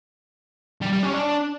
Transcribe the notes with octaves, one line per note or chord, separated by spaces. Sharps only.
G3
G3
C#4
D4